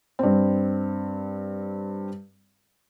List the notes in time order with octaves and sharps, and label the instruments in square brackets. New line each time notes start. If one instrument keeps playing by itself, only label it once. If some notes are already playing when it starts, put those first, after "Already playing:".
[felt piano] G2 C4